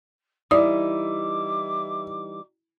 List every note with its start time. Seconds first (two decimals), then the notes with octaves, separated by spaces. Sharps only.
0.51 E3 G3 D#4 E4 D5 D6 D#6